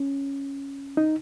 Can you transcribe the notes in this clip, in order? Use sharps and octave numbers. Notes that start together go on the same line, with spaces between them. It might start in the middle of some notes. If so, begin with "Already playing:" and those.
Already playing: C#4
D#4